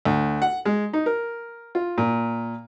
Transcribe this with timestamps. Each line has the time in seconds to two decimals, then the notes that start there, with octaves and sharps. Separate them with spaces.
0.05 D2
0.42 F#5
0.65 G#3
0.93 D#4
1.06 A#4
1.75 F4
1.98 A#2